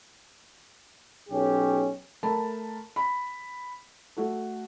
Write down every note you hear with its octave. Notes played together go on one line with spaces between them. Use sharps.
B1 C#4 G4
A3 A#4 A5 B5
B5
A3 F#4 A4